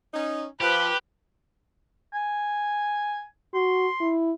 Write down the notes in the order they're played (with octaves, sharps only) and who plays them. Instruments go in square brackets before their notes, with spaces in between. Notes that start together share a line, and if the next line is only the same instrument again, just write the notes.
[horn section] C#4 D#4
[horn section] F3 [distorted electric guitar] G4 [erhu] B4
[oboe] G#5
[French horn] F#4 [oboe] C6
[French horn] E4